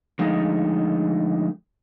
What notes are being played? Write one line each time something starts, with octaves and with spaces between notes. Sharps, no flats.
D3 F3 G#3 A3 D#4